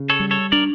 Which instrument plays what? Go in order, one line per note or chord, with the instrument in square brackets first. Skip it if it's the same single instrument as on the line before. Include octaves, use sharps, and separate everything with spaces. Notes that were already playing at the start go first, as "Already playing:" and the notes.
Already playing: [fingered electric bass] C#3
[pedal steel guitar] A4 C#5
[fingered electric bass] G3
[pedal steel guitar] A4 C#5
[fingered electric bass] D4 [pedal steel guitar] A#4 D5